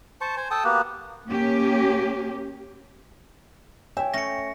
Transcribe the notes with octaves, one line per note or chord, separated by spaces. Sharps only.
C5 A5 C#6
C5 G#5
A4 G5 A5 D#6
A#3 B3 F#4 G4
A#3 C#4 G4
C#5 E5 G5 G#5
A3 C#4 A#6 C#7